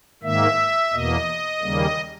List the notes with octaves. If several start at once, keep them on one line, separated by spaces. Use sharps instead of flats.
G#2 D#3 A#3 E5
E2 B2 A#3 D#5
D#2 C#3 G3 A#3